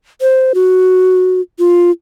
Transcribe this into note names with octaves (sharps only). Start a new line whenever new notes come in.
C5
F#4
F4